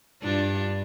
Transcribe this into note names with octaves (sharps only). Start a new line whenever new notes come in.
G2 D4 F4